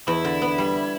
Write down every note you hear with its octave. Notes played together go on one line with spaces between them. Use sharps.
E2 E4
D3
B3
G3